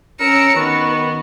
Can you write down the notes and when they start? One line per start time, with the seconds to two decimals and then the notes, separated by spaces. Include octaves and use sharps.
0.20 C#4 A#4 E6 C#7
0.56 D#3 B3 F#4